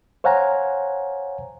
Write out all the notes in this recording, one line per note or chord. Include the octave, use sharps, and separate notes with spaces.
C5 C#5 F5 F#5 G#5 A#5